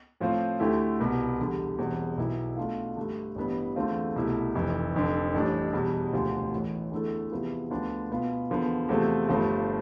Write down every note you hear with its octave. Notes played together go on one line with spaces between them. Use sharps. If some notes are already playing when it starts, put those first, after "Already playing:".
A2 F3 C4 F4
D2 D3 A3 E4 G4
C2 B2 B3
E2 D3 G3
E1 E2 B2 G3 C4
B1 B2 B3 E4
B2 A3 D4 F4
G2 D3 A3 D4
A1 G2 E3 B3
E2 D3 A3 C4 F4
C2 B2 A3 E4
F1 F2 E3
F1 F2 D3
A1 A2 G3 D4
E2 B2 G3
E1 D2 C3 F3
A1 A2 E3
E2 D3 A3 E4 A4
E2 C3 F3 B3 E4
D2 D3 F3 B3 D4
B2 B3 F4
E2 D3 F3 B3
E2 C3 F3 A3 C4
G1 G2 F3 A3